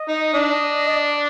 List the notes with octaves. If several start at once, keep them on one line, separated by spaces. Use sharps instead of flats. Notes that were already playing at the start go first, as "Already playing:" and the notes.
Already playing: D#5
D#4
D4
D5